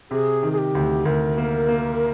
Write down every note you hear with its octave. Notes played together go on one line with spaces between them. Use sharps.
C3 G#4
D#3
G#4
G4
D2
D2 A#4
A#3
A#3